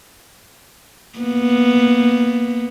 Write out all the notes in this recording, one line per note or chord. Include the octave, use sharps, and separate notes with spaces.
A#3 B3